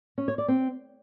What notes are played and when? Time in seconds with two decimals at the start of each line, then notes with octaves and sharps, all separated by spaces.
0.18 C#4
0.28 C#5
0.38 D5
0.48 C4